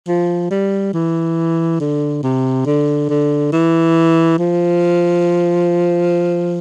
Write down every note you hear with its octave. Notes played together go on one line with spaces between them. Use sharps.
F3
G3
E3
D3
C3
D3
D3
E3
F3